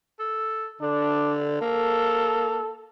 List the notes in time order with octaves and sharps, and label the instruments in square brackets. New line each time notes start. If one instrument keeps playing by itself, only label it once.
[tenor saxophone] A4
[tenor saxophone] D3 [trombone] D4
[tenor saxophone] A#3 [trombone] A4